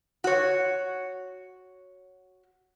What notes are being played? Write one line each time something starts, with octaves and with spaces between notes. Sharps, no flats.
F#4 C#5